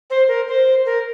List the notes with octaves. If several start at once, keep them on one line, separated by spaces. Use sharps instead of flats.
C5
A#4
C5
A#4